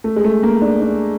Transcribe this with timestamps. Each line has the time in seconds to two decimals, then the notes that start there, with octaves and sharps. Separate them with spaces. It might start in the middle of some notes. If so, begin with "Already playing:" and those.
0.04 A3
0.16 G#3
0.24 A3
0.43 A#3
0.62 D4
0.81 D4